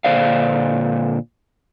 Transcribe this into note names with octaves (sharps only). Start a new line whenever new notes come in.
A#2 D3 D4 C5 D5 F5